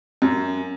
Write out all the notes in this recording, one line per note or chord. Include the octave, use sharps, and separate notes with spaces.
F#2